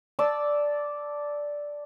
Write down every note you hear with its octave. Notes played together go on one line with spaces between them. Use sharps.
D5 A5 E6